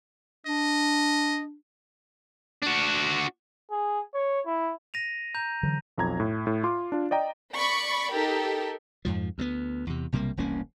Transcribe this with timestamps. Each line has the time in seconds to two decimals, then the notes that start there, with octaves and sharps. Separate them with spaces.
0.47 D4 D#5
2.63 D4 F#4
3.71 G#4
4.14 C#5
4.46 E4
4.94 A#6 D#7 F7
5.35 A#5 G6 F7
5.63 D3 E3 F#3
5.97 B1 F2 A#5 G#6
6.20 A2
6.47 A2
6.63 F4 C6 D6
6.92 D4 F4
7.11 D5 D#5 G5 A#5
7.56 D5 B5 C#6
8.13 D#4 G4 A4 A#4
9.05 F2 G#2 F3
9.38 D2 F#3 B3
9.87 E2 C3
10.12 B1 C3 G3 A#3
10.37 E1 C2 A#3 C#4